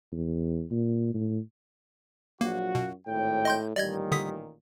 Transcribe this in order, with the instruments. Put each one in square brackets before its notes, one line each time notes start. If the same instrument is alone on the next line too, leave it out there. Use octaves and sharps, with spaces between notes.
[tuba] E2
A#2
A2
[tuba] A#1 [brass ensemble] F#3 F4 F#4 [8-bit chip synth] A#3
[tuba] F#2 [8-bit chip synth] B2
[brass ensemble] G#1 C#5 G5 [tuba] A2
[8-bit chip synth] D#5 C6 G6
[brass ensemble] A1 A#2 D#3 [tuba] G3 [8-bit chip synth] D5 D#5 G#6
[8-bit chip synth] D3 D#6 B6